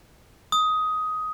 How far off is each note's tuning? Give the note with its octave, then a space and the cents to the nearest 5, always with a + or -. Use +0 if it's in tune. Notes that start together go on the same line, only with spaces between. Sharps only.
D#6 +15